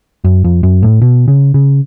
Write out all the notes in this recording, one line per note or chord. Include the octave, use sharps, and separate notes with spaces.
F#2
F2
F#2
A2
B2
C#3
C#3